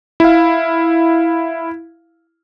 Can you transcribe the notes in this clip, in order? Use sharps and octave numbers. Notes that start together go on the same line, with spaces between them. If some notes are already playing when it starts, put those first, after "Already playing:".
E4 F5